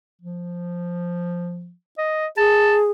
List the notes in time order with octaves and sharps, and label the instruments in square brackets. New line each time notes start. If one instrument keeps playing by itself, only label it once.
[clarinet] F3
D#5
[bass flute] G#4 [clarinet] A5